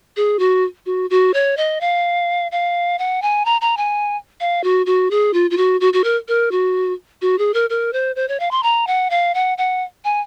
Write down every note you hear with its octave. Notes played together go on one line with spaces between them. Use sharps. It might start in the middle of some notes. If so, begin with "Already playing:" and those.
G#4
F#4
F#4
F#4
C#5
D#5
F5
F5
F#5
G#5
A#5
A#5
G#5
F5
F#4
F#4
G#4
F4
F4
F#4
F#4
F#4
A#4
A#4
F#4
F#4
G#4
A#4
A#4
C5
C5
C#5
F5
C6
A#5
F#5
F5
F#5
F#5
G#5